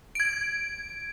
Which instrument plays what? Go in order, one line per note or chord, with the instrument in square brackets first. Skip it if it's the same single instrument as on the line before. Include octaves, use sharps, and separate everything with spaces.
[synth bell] G#6 D7